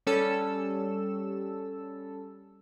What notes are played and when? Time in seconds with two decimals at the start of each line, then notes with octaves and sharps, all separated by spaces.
0.07 G3 C#4 A4 E6